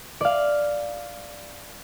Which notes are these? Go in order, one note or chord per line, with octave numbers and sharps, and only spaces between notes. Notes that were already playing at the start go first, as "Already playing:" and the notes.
D5 F5